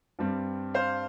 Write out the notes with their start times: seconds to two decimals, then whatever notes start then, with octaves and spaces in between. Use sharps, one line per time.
0.19 G2 G3 C4
0.74 C5 F5